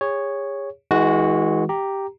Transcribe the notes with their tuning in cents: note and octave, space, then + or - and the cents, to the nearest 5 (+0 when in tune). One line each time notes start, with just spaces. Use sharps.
G#4 -35 C#5 +0
E3 -40 G#3 +0 F#4 +0
G4 +0 A#5 +0